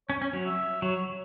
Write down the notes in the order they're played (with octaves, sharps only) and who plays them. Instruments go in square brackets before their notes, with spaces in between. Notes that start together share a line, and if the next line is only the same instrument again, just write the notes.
[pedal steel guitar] C#4 [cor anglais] C#5
[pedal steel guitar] C#4
F#3
[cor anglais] E5
[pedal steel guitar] F#3 [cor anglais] C#5